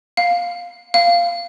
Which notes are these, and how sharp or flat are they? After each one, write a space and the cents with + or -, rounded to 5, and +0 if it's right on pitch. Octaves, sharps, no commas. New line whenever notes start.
F5 +10
F5 -10